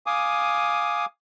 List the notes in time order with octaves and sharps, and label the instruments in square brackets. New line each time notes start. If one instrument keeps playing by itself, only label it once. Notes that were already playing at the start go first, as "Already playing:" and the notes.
[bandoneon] F5 G#5 D6 D#6